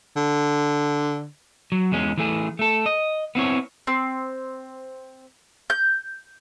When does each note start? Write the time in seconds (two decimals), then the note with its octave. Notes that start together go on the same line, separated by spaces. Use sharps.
0.16 D3
1.72 F#3
1.92 E2 G#3 C#4
2.18 E3 A3 G#4
2.59 A3 A4
2.86 D#5
3.35 B3 C4 E4 C#5
3.87 C4
5.70 G6